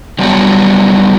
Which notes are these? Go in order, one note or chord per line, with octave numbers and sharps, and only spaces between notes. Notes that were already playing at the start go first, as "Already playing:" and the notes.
F#3 G3 B3 D4 F4 F#4